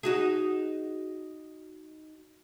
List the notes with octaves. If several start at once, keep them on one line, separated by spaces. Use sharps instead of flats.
D#4 F#4 G#4